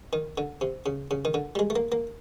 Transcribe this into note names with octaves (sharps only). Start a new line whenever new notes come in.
D#3
D3
C3
C#3
C#3
D#3
D3
G3
G#3
A3
A#3
A#3